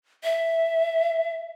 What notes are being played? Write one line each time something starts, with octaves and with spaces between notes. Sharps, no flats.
E5